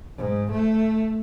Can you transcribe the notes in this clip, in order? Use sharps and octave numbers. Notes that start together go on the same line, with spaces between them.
G#2
A3